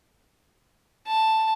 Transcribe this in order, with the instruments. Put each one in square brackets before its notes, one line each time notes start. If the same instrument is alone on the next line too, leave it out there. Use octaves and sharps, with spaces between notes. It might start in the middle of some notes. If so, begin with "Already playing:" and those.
[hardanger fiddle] A5